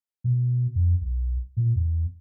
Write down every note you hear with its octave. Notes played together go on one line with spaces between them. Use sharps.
B2
F2
B1
A#2
E2